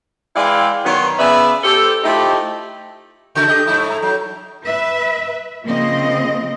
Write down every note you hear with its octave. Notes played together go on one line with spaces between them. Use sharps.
E3 G#3 E4 D5 F5 G5
B2 D#3 F#3 B3 C#5 C6
C#3 B3 B4 D5 E5
G4 A4 C5
F3 A3 D#4 E4 G4
C#3 F#4 A4 G6
G4 A4 D#5
G2 A3 E4
A#5
F#3 G6
B4 E5
C#3 F3 A#3 C4 D#5